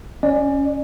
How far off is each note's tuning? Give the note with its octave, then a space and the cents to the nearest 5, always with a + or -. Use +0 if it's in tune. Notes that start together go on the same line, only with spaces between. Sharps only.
C#4 +0 D5 +30